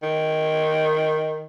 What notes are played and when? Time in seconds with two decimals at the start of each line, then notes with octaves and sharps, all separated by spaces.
0.03 D#3